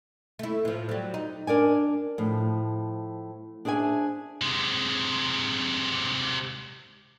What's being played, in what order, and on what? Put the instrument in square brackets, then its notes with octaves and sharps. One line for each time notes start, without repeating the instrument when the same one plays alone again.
[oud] A3 E4
A2 F3
F#3 G3
D#4
[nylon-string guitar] D4 A#4 D5 G#5
A2 F3
D4 G#4 C5 E5 G#5
[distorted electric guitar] C3 G#3